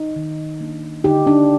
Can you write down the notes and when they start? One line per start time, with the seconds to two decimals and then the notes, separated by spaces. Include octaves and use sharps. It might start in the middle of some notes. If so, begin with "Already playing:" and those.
Already playing: D#4
0.16 D#3
0.61 A#3 D4
1.04 D3 D#4 G4
1.27 D4